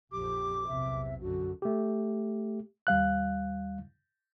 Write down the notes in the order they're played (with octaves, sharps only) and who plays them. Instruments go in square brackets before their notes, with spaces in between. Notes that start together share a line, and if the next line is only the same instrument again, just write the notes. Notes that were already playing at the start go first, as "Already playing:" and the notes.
[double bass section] A#1 F2 [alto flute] G4 [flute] D6
[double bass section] B1 E2 C3 [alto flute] E5
[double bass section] F#2 D3 [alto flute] F#4
[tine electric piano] A3 G4
[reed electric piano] D#2 G3 F5 F#6